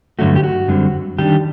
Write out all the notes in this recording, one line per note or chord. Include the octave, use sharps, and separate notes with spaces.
G2 D3 F#3 A3 F#4
G4
F#4
F#2 D3 G3 C4
D#3 G3 D4 G4